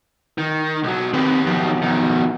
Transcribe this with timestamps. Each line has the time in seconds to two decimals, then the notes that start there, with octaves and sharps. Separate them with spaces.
0.38 D#3
0.83 B1 F#3
1.14 D#3 C4 G4 B4
1.46 F3 F#3 B3
1.82 B2 D#3